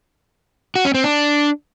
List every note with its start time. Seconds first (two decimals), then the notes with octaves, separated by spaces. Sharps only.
0.75 F#4
0.85 C#4
0.94 C4
1.04 D4